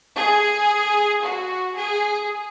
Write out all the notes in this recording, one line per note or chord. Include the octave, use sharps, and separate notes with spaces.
G#4
F#4
G#4